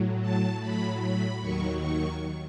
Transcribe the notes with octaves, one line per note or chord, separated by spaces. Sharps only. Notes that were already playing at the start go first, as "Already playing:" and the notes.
Already playing: A2 F#3
A5
A2 F#3 B5
B5
D#2 D#3 F#3 C#6
C#6